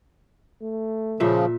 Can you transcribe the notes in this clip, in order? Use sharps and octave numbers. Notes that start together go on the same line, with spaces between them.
A3
A#2 C#3 F3 E5